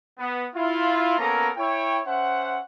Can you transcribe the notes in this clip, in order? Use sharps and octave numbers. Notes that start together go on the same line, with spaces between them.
B3
E4 F4
A#3 B3 C#4 A4 A#4 A#5
E4 C#5 G5
C#4 C5 E5 F#5